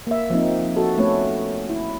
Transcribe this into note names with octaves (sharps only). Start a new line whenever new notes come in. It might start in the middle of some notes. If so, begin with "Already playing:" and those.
A#3 E5
F3 A#3 C4 D#4
F#4 A4
A3 B3 C#4 B4 C#5
E4